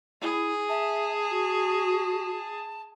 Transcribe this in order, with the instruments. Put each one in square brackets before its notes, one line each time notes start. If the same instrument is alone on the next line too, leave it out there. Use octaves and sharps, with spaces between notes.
[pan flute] E4 [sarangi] G#4
[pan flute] E5 [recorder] A5
[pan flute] F#4